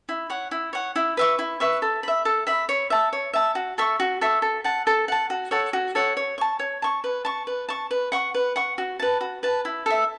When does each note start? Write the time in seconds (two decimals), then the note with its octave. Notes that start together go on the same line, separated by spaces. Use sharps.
0.09 E4
0.30 C#5 F#5
0.51 E4
0.73 C#5 F#5
0.96 E4
1.17 B4 E5 C#6
1.39 E4
1.60 B4 E5 C#6
1.82 A4
2.03 E5 B5
2.25 A4
2.47 E5 B5
2.69 C#5
2.90 E5 A5
3.13 C#5
3.33 E5 A5
3.55 F#4
3.78 A4 E5 C#6
4.00 F#4
4.21 A4 E5 C#6
4.42 A4
4.64 F#5 A5
4.87 A4
5.08 F#5 A5
5.30 F#4
5.51 A4 C#5 F#5
5.73 F#4
5.95 A4 C#5 F#5
6.17 C#5
6.38 A5 C#6
6.59 C#5
6.82 A5 C#6
7.04 B4
7.25 A5 C#6
7.47 B4
7.68 A5 C#6
7.91 B4
8.12 F#5 C#6
8.34 B4
8.56 F#5 C#6
8.78 F#4
8.99 B4 A5
9.21 F#4
9.43 B4 A5
9.65 E4
9.86 A4 E5